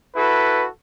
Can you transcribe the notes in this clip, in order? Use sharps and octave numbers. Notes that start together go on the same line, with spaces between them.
E4 F#4 A4 B4